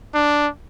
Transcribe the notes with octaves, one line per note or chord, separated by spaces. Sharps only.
D4